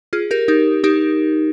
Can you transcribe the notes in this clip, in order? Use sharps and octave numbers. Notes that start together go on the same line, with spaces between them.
F4 G#4
G4 A#4
D#4 G4
D#4 G4